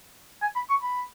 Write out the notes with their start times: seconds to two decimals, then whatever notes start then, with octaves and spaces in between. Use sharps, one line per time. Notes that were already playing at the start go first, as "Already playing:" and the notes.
0.42 G#5
0.56 B5
0.70 C#6
0.83 B5